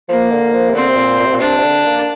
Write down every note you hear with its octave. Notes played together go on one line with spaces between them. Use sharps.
F3 A#3
D3
F3
C3
D3 C4
C3
A#2
A#2
C3
A#2
C3 D4
C3
D3
A#3